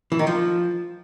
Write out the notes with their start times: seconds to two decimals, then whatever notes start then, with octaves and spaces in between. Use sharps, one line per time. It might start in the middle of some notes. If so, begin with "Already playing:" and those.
0.12 E3
0.19 D#3
0.27 F3